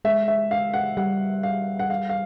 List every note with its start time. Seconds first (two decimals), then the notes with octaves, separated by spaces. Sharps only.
0.05 G#3 E5
0.28 E5
0.51 F5
0.74 F#5
0.97 G3 F#5
1.43 F5
1.79 F#5
1.90 F5
2.09 F5